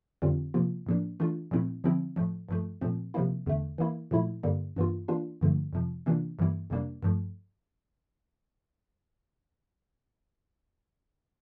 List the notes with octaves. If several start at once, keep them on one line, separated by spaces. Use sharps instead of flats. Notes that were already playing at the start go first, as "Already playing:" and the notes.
F2 D3 G3 C4 F4
C3 F3 A#3 F4
A2 F3 A#3 D4
E3 A3 D4 F4
A#2 F3 A3 C4 E4
D3 F3 C4 E4
A2 F3 A3
G2 F3 A3
A#2 F3 A3 C4
C3 F3 A#3 E4
E2 D3 A3
E3 A#3 E4
A#2 F3 A3 E4
G2 D3 G3 A#3
G2 E3 A#3 F4
E3 A#3 D4 F4
G2 D3 F3 A3
F2 C3 F3
C3 E3 A#3 D4 F4
G2 E3 G3 A#3 E4
F2 C3 G3 A#3 D4
G2 F3 A3